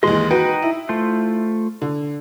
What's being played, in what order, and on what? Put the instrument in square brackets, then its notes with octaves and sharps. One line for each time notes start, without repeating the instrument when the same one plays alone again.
[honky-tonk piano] D#2 E3 G#3 [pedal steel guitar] D#5 C6
[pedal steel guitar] D#4 G5 [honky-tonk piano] F#4 B4
[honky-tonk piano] E4
[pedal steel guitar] A3 F4 C5
[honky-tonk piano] D3